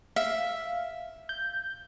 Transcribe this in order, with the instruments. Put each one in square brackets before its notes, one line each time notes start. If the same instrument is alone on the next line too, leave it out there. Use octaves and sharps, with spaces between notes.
[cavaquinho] E5 [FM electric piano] F5
[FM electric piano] G6